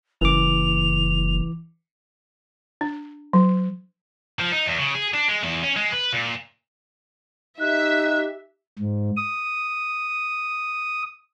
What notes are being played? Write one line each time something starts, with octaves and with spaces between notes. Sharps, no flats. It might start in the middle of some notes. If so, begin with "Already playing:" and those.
F#1 E3 D6 F7
D4
F#3
F3
D#4
E2
C#3
G#4
D4
G#3
E2
C#4
G#3
B4
A#2
D#4 G4 E5 F#6
G#2
D#6